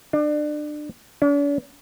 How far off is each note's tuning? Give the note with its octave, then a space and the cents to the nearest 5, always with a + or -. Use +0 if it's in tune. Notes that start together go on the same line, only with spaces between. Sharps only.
D4 +30
D4 -45